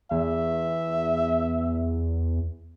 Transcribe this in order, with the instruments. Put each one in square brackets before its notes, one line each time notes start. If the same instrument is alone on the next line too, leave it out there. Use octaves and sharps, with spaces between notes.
[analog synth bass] E2 [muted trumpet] E5